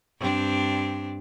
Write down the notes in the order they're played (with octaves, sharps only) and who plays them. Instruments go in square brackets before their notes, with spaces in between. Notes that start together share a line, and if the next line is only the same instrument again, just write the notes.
[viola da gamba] G2 C4 D4